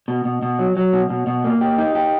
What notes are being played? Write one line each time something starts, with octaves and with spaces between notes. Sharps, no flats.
B2
B2
B2
F#3
F#3
B2
B2
B2
A#3
G4
D#4
G4